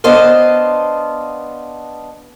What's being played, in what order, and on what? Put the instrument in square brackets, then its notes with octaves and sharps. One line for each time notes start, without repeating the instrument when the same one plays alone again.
[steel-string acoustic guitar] B3 D4 C5 D#5 F5